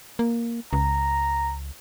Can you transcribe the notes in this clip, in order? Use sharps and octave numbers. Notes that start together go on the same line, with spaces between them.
A#3
C#2 A#5